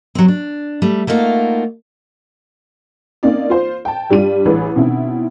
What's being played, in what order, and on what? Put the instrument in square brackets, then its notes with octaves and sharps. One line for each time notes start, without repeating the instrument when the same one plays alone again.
[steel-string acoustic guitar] F#3 C4
D4
G3 A3
A3 A#3 D#4 F4 F#4
[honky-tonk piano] A#3 C4 C#4 D#4 D5
F4 C5
G5 A5
G2 G3 D4 F4 D#7
A1 E3 G#4 B4
B2 D#3 C4 C#4 E4